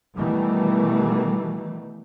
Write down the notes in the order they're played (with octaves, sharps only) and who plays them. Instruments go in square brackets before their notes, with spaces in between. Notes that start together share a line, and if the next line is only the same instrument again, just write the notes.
[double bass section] B2 D#3 E3 G3 A3